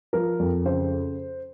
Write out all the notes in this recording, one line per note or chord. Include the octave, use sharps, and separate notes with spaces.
F3 A#4
F2
C#3 C5